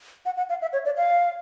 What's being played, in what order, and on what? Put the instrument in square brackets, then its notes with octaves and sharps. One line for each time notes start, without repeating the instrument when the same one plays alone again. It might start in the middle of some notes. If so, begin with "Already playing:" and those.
[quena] F#5
F#5
F5
E5
C#5
D5
F5